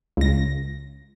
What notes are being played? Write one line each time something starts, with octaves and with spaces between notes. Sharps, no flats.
C#2 A#6